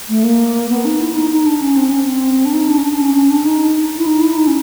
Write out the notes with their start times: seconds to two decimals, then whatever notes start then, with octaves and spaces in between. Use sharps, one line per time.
0.09 A3
0.23 A#3
0.69 B3
0.85 D#4
1.00 E4
1.15 D#4
1.31 D#4
1.46 D4
1.61 C#4
1.77 C4
1.91 C#4
2.04 C4
2.45 D4
2.53 D#4
2.69 D4
2.78 C#4
2.83 D4
2.99 C#4
3.15 C#4
3.30 D4
3.45 D#4
3.98 E4
4.07 D#4
4.21 E4
4.37 D#4
4.47 C#4